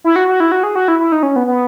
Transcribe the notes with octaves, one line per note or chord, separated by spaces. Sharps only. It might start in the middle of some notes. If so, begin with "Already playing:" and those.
E4
F#4
F#4
E4
F#4
G#4
F#4
E4
E4
D#4
C#4
B3
B3